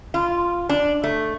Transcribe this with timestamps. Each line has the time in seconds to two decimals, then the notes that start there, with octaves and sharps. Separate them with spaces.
0.14 F4
0.69 D4
1.04 A3